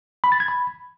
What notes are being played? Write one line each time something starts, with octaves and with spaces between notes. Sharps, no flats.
B5
A6
G#6
B5